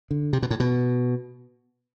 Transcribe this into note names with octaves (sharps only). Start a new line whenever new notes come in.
D3
C3
B2
A2
B2